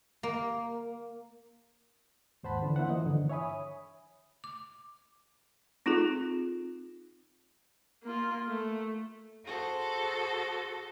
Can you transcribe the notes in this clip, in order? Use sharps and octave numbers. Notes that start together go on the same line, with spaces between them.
A#3
D#2 G#2 C5 F#5 A5 B5
D3 E3 C#4 D4
A#3 E4 C5 F#5
E3 F3 D#5
G2 D3 E3
C#5 E5 G#5 B5 D#6
D6
C4 D#4 F4 G#4 A4
A#3 F4
A3
F#4 G#4 A4 C5